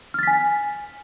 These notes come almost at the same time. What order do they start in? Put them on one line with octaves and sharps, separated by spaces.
F6 A6 B6 G#5